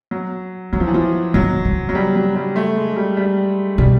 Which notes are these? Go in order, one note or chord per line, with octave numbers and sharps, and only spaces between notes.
F#3
D#3 F#3
F3
E3
F3
D#3 F#3
C#3
F#3
G3
F#3
G3
A3
G#3
G#3
G3
G3
B2 G3